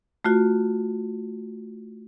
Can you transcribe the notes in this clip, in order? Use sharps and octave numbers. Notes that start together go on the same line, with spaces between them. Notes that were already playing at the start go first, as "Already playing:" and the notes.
A3 F4 F#4